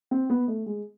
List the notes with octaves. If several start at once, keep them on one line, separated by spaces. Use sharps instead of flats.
C4
B3
A3
G#3